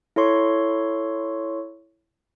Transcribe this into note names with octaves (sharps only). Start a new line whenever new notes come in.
E4 A4 C#5 C6 C#6